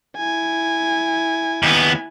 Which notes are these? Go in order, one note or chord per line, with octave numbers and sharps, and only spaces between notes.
E4 G#5
D#2 B3